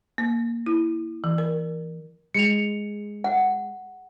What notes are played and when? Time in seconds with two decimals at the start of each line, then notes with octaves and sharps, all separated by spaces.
0.18 A#3
0.66 E4
1.24 E3
1.38 A#4
2.34 G#3 C#7 F7
3.24 F#5